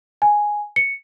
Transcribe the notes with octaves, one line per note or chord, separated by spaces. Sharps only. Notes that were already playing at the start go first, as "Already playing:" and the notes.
G#5
C#7